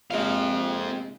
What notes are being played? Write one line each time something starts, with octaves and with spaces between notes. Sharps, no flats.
A#1 C3 G#3 C4 F5